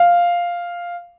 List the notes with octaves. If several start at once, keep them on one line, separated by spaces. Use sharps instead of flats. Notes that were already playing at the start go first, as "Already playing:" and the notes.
Already playing: F5